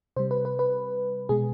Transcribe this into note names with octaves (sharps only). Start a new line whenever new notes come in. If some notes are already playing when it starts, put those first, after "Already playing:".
C3 G3 C5
B4
B4
B4
B2 G#3 G#4